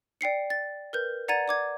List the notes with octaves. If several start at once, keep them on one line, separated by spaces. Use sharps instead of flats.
D5 G5 C7 C#7
A6
A#4 B4 G6
D5 F#5 A#5 G#6 A6 D#7
D5 D6 G#6